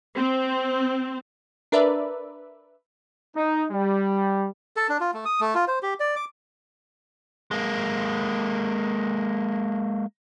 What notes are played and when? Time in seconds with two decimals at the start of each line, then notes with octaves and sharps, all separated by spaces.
0.16 C4
1.72 D4 A#4 B4 D5 E5
3.37 D#4
3.72 G3
4.76 A4
4.89 D4
5.00 F4
5.14 A3
5.25 D#6
5.40 A3
5.55 F4
5.68 C5
5.82 G4
6.00 D5
6.16 D6
7.51 G#3 A#3